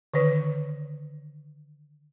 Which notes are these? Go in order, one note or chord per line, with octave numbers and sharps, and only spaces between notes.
D3 D#3 B4 C#5